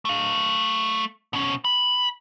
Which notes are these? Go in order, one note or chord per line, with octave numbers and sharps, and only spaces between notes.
A3 F5
B2 C#4
B5